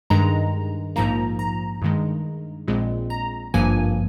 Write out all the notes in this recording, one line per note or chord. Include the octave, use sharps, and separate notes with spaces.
G2 D#3 G#3 A#5
A#1 G#2 F3 A#3 A#5
A#5
G2 D#3 G#3
A#1 A#2 G#3 C4
A#5
G#1 G2 F3 A#3 G#5